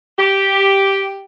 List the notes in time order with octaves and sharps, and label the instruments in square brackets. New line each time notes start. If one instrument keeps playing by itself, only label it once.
[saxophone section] G4